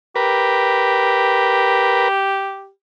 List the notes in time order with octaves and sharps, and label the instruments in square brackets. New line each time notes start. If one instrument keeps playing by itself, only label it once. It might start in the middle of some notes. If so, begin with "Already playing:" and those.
[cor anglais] G4 [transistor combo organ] A#4 B4